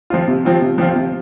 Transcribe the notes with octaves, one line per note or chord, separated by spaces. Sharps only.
F3 C4 F4
C3
F3 C4 F4
C3
F3 C4 F4
C3